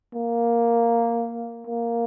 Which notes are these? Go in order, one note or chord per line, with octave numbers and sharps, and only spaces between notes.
A#3
A#3